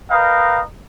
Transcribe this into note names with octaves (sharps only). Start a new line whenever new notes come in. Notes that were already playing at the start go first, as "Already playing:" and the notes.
A#4 B4 D#5 F5 G5 A#5